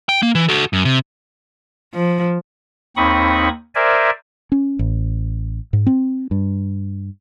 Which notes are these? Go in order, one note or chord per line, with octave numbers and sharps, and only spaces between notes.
G5
A#3
E3
F#4 A4
F#2
C3
F3
D#2 C4 D#4 B5 C#6 D#6
A#4 C5 D5 E5 G#5
C#4
A1
G#2
C4
G2